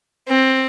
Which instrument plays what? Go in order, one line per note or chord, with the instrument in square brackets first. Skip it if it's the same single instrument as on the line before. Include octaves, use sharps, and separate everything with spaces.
[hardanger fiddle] C4